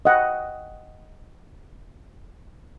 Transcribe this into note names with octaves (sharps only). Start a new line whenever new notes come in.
D#5 F#5 G5